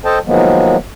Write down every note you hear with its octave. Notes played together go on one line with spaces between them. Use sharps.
A4 C5 D#5 G5 A5
D#3 F3 F#3 G#3 A#3 B3